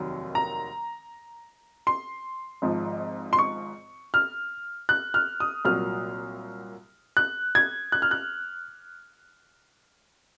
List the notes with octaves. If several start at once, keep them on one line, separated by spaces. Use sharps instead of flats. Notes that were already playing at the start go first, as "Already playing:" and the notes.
Already playing: F1 D#2 D#3 F#3
A#5
C6
G#1 G#2 F3
C6
C#6
F6
F#6
F6
D#6
C2 A#2 F#3 F6
F#6
G#6
F#6
F6
F#6